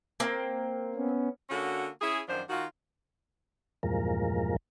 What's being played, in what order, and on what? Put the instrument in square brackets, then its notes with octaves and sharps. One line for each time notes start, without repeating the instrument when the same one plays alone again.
[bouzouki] A#3 C4
[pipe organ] B3 C#4
[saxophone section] D3 A#3 C#4 F#4
C#4 E4 G#4
F#2 D#3 F3 D4 C5
D#3 F4 F#4
[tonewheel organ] E2 G2 A#2 F3 G#3 A#4